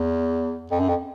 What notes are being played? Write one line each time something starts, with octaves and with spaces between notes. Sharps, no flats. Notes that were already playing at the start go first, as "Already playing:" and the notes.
Already playing: E2
F2
F#2
F2